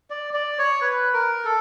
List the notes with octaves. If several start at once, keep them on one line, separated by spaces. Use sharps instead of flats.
D5
D5
C#5
B4
A#4
A4